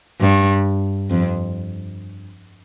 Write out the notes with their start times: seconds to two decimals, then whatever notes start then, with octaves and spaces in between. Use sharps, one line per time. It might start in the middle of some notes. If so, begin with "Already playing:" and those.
0.20 G2
1.10 F2